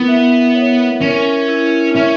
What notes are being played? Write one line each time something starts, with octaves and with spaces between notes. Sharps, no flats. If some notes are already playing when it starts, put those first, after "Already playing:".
Already playing: B3 E4 A#4
E5
C#5
C#4 A#4
E4
C#4 E5